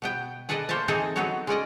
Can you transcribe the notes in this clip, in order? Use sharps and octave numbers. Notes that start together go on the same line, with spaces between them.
B2 B3 G5
G#4 A4 B4 D5 D#5
A3 A#3 C5 C#5 E5 A5
E3 C4 D#4 G#4 A4 G#5
F#3 B3 D#4 F#4 A4 C#5
G#3 C#4 D5 D#5